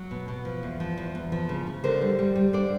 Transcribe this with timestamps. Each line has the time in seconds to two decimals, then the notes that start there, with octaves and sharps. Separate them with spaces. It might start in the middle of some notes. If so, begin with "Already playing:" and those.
Already playing: F#3
0.11 B2
0.28 B2
0.45 F3
0.63 E2
0.80 F3
0.97 E2
1.15 E2
1.32 F3
1.49 C#3
1.67 C#3
1.84 D3 A#4 C5
2.02 G3
2.19 G3
2.36 G3
2.53 D3 C5 D5